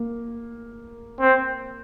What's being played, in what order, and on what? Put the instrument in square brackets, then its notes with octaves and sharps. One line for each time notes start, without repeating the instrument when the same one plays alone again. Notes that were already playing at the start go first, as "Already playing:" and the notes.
Already playing: [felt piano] A#3
[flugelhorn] C4